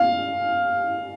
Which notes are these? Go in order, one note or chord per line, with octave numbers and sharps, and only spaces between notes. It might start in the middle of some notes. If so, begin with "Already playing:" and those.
Already playing: F5